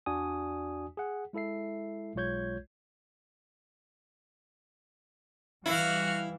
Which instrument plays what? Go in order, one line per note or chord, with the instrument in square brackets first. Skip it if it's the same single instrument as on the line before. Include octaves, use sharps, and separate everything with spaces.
[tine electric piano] E2 D4 F#4 D5 G#5 D#6
G#4 F#5
G#3 E4 A4 E5 C7
B1 G#3 F4 C#5 G6 G#6
[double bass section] E3 G3 [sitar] E4 [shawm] F#4 [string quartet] F5 F6